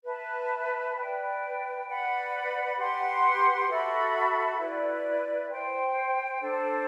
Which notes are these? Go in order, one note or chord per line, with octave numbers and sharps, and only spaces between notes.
B4 E5 A5
B4 D5 G5
B4 D5 F#5 B5
G4 B4 F#5 C6
F#4 A4 E5 B5
E4 B4 D5
C5 G5 C6
D4 A4 C5